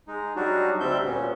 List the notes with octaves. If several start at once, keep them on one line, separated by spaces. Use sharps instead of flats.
G#3 D#4
F#3 G3 D4 D#4 F#4
D2 G3 C4 E5 G6
A#2 B3 C#4